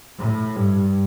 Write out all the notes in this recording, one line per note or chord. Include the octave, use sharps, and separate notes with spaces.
A2
G2